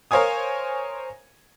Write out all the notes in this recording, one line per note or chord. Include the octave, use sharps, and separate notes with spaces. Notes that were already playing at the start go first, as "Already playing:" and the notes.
A#4 C5 C#5 F5 G#5 D#6